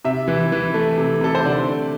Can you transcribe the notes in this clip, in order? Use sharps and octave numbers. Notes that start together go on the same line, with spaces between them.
C3 E5
E3
E3
A3
C3
C3 A4
C5
D3 D5
A3